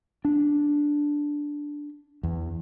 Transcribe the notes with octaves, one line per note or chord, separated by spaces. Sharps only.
D4
E2